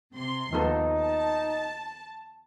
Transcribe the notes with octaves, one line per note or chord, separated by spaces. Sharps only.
C3 C6
D#2 F3 B3 D#4 A4
A5